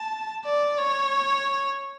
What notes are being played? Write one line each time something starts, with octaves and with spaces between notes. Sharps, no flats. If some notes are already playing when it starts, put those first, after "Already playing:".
Already playing: A5
D5
C#5